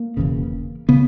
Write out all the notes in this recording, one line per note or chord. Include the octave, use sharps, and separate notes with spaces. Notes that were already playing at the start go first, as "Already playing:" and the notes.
Already playing: A#3
E1 E2 C#3
C#3 B3